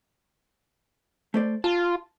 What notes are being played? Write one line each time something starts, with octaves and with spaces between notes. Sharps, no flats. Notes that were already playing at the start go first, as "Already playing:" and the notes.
A3 C5 D5
F4 A5